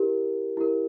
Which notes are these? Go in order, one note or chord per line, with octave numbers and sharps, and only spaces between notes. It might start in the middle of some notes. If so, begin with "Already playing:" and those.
Already playing: E4 G4 A#4
E4 G4 A#4